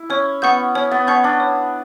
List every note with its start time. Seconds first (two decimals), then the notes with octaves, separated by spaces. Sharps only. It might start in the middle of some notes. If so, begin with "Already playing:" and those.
Already playing: E4
0.10 C#4 C#5
0.42 B3 F#5 C#6 G6
0.75 C#4 C#5
0.91 B3
1.07 C#4 F#5 C#6 G6
1.24 D4
1.40 C#5